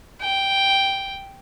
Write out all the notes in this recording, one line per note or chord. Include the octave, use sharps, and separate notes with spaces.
G5